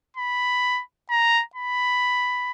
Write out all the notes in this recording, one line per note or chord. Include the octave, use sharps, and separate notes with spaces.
B5
A#5
B5